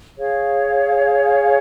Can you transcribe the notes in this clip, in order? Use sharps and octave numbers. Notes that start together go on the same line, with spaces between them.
G#4 C#5 F5